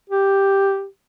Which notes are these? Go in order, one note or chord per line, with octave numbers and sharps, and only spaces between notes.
G4